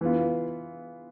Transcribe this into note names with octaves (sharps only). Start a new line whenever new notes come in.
E3 B3 F4